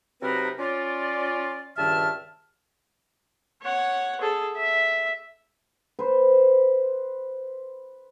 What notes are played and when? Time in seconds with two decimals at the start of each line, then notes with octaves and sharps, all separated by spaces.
0.22 C3 F#3 C4 D#4 A#4 B4
0.59 C#4 F4 D5
1.77 C#2 G2 D#3 E5 A5 F6
3.62 C#5 F#5
4.21 G#4 A4
4.56 E5
5.99 B4 C5